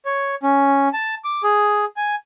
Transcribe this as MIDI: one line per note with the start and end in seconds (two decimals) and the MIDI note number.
0.05 0.35 73
0.43 0.88 61
0.93 1.15 81
1.24 1.42 86
1.43 1.85 68
1.97 2.15 80